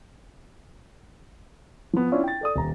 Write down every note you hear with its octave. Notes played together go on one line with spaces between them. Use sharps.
F3 B3
C#4 D4 E4 F4
G5 A6
A4 D5 D#6
D#1 A#5